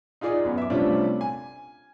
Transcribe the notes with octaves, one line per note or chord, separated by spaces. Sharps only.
D#4 F4 G#4 D5 D#6
F#2 B3
E5 D6
C3 G3 A3 C#4 D4 F4
G#5